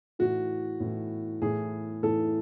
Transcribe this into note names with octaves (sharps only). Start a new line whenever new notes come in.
A2 E3 F#4
A2 E3
A2 E3 G#4
A2 E3 A4